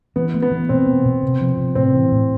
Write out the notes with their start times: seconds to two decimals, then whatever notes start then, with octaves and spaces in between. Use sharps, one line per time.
0.16 E3 B3
0.34 A3
0.42 B3
0.51 E3
0.69 B2 C4
0.87 B3
1.05 B2
1.23 C3
1.41 F3
1.58 C3
1.75 A2 C4
1.94 E3
2.12 A2